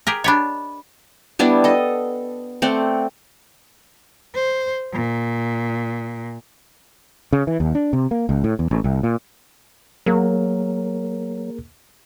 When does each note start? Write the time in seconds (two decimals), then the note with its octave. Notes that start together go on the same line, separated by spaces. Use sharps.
0.07 G4 G#4 A#4
0.24 D4 G4 C#5 D#5 B5
1.39 G3 B3 D4 E4
1.64 A4 D#5
2.62 A3 C4 D5 F#5
4.34 C5
4.93 A#2
7.33 C#3
7.47 E3
7.60 D#2
7.75 D4
7.93 C3
8.11 A#3
8.29 C#2
8.44 A2
8.59 E2
8.71 A1
8.84 C2
9.03 A#2
10.06 F#3 A#3 G#4 A#4